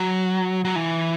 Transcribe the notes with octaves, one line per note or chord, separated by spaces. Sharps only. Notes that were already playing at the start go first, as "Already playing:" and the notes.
Already playing: F#3
F#3
E3